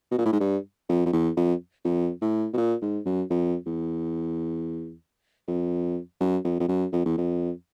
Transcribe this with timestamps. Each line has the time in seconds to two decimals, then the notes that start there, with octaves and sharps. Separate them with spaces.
0.11 B2
0.19 A#2
0.26 A2
0.33 G#2
0.40 G2
0.89 F2
1.06 F2
1.13 E2
1.37 F2
1.85 F2
2.22 A2
2.53 B2
2.58 A#2
2.82 G#2
3.06 F#2
3.30 F2
3.67 E2
5.48 F2
6.21 F#2
6.45 F2
6.60 F2
6.69 F#2
6.93 F2
7.06 E2
7.18 F2